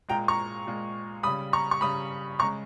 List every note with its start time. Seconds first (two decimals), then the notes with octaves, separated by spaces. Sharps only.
0.09 A#2 G#3 G5 A#5
0.28 A#5 C#6
0.67 A#2 G#3
1.23 C#3 G3 B5 D#6
1.53 A#5 C#6
1.71 C#6
1.81 C#3 G3 B5 D#6
2.39 C#3 G#3 A#5 C#6